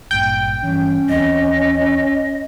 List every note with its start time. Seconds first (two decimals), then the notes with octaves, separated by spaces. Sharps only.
0.11 G#1 G2 A#2 G5
0.64 G2 E3 C#4
1.09 D#2 E3 C4 D#5